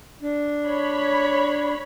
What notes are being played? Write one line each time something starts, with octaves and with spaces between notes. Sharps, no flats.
D4
C#5 B5